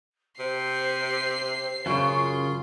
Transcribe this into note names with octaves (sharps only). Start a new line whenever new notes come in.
C3 C5 C7
F#2 C#3 F4 C#6